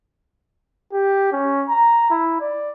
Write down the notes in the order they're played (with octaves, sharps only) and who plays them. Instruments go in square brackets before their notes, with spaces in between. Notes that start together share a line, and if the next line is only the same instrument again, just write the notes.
[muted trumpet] G4
C#4
A#5
E4
D5